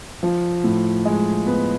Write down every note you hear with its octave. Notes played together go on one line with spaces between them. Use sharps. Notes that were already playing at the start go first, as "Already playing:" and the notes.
F3
A2
G#3
B3